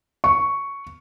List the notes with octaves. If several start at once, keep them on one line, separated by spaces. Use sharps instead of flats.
C#6